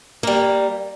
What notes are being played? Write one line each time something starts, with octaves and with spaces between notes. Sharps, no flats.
G3 A#3